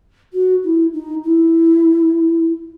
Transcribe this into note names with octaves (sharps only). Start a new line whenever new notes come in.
F#4
E4
D#4
E4